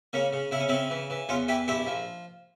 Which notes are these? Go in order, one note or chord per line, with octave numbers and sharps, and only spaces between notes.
C#3 A#3 C#4
C#3
C#3 E4
C#4
C#3 C4 E4
E3
E3
E2 C#4 F4
E3 E4 G4
A#1 E4 G4
F3